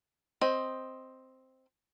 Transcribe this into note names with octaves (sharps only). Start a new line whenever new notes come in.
C4 D#5